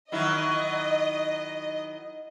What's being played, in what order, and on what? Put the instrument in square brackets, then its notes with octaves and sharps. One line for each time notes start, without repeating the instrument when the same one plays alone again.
[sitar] D#3 F#3 E4 [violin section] D#5